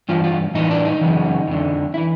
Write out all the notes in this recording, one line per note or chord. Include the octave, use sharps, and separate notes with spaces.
G2 E3 F4
F4
A2 E3 D#4
D4
D#4
F#2 C#3 E3
F2 D3
E3 E4